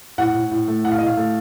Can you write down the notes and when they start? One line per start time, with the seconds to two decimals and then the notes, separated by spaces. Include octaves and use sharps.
0.18 A2 F#5
0.35 A2
0.51 A2
0.68 A3
0.84 A2 F#5
0.92 F5
0.98 A2 D#5
1.07 F5
1.17 A3